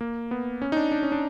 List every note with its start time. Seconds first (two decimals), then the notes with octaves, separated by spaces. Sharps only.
0.01 A#3
0.31 B3
0.62 C#4
0.72 D#4
0.77 D4
0.92 D4
1.03 C#4
1.12 D4